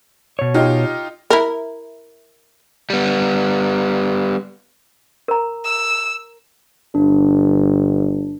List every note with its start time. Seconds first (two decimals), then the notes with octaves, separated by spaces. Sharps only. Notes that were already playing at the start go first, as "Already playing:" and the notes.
0.39 B2 C#5
0.54 D#4 F4 G4
1.30 E4 A#4
2.90 G3 B3
5.28 A#4 A#5
5.64 E6
6.95 G1 D4